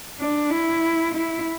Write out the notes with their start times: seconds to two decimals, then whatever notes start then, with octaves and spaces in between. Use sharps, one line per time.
0.20 D4
0.50 E4
1.14 E4